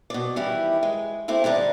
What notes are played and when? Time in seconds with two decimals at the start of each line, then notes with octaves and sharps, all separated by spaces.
0.10 B2 D5
0.36 D#3 E3 G3 E4
0.83 G#3
1.28 A3 C4 E4 G4
1.44 D3 G3 D4 D#4